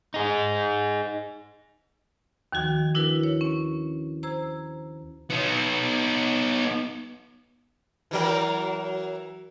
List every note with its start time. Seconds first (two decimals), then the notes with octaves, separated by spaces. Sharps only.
0.14 D#4 G#4
2.52 D#2 D#3 F3 F#4 G#6
2.95 D4 E4 F#4 A#4 B4
3.24 C#5
3.41 C#4
4.23 C5 A#5 E6 G#6
5.30 B3 D#4
8.11 E3 F#3 A#4